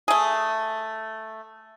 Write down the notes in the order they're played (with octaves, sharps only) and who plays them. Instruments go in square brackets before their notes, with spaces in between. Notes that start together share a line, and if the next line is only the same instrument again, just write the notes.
[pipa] A3 G#4